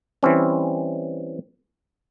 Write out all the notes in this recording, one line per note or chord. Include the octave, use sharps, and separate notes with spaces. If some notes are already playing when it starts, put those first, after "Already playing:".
E3 G3 C4 C#4